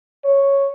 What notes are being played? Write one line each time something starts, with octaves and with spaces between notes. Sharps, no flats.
C#5